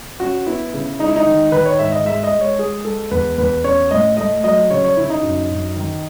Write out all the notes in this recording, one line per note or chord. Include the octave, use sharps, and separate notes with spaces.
C#4 F#4
B3 E4
C#3
G#3 D#4
E4
D#4
D#3
D#3 B4
C#5
G#2 E5
D#5
G#3 E5
D#5
G#3
C#5
G#3 G#4
G#3 A4
E2 B4
E2 B4
C#4 C#5
A2 D#5
A3 D#5
F#3 D#5
C#3 C#5
C#5
C#3 E4
D#4
F#2
F#2
D#3